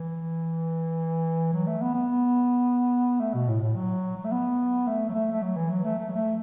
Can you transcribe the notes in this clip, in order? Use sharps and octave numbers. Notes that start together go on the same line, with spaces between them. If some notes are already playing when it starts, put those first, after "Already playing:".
Already playing: E3
F#3
A3
B3
B3
A3
B2
A2
A2
F#3
F#3
A3
B3
A3
F#3
A3
A3
F#3
E3
F#3
A3
A3
F#3
A3